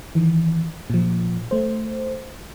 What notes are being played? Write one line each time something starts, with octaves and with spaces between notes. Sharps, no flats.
D#3 E3
A#2 F3
A3 C5